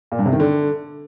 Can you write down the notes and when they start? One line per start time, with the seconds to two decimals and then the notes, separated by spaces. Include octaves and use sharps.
0.12 A#2
0.19 G2
0.26 C3
0.33 D#3
0.40 D3